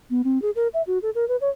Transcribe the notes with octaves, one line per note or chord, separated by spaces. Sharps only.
B3
C4
G#4
A#4
E5
F#4
A4
A#4
B4
C#5